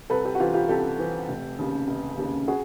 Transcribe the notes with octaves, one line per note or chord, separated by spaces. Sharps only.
C2 A4 B4
G4 A4
F#4
C3 E3 F4 G4
F4 G4
C2 G4 A4
C3 E3
F1
D#2 C#3
F1
D#2 C#3
F#4 G#4